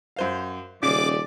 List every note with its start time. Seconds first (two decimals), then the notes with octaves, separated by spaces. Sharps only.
0.16 F#2 C5 F5
0.83 D#1 C#3 D5 D6